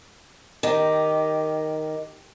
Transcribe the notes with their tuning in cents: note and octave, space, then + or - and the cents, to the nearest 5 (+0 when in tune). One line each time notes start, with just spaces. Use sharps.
D#3 +0 G4 +0